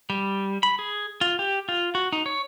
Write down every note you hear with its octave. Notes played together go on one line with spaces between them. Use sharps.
G3
B5
G#4
F4
G4
F4
F#4
D#4
C#5